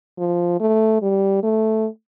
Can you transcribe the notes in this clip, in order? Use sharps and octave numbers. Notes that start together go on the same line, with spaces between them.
F3
A3
G3
A3